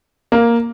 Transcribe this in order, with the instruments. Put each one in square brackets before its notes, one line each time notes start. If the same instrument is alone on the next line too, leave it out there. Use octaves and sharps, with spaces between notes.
[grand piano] A#3